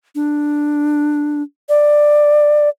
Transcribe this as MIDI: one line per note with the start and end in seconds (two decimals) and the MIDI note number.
0.15 1.42 62
1.69 2.69 74